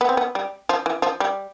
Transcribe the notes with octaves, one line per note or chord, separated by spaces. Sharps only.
B3
C4
B3
G3
F3
E3
F3
G3